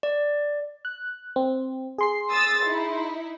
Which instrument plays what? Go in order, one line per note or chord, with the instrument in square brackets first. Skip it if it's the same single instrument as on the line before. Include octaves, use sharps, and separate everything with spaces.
[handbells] D5
[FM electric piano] F#6
C4
G#4 C6 C7
[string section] D#6 E6 A6
D#4 E4